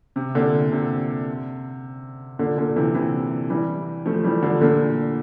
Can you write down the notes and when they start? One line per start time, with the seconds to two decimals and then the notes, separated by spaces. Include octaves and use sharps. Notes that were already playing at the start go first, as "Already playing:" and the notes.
0.16 C3
0.35 A#2 D3
0.72 C3
2.39 A#2 D3
2.58 A#2 D3
2.76 C3 E3
2.95 C3 E3
3.50 E3 G3
4.06 F3 A3
4.24 E3 G3
4.42 D3 F3
4.61 A#2 D3